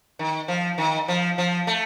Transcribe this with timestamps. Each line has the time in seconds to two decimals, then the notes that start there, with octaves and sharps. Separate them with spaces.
0.19 D#3
0.48 F3
0.78 D#3
1.08 F3
1.38 F3
1.67 A3